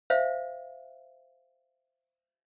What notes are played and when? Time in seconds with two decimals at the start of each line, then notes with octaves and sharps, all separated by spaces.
0.10 C5 E5 F5